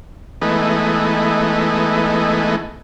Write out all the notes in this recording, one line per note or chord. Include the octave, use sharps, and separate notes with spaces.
E3 G#3 A3 B3 D#4